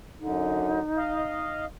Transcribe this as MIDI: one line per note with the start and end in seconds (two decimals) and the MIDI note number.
0.20 0.80 42
0.20 0.80 50
0.20 1.66 63
0.98 1.65 75
0.98 1.65 77